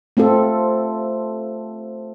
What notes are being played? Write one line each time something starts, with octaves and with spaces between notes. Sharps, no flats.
A3 C4 F4 A4